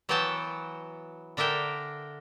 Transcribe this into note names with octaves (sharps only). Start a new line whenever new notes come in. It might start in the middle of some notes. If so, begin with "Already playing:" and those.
E3 F#3 B3 F#4 G5 A5
D3 D4 A#4 E5 G5